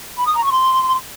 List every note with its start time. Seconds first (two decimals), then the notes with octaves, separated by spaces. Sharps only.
0.18 B5
0.27 D#6
0.35 A#5
0.43 C#6
0.51 C6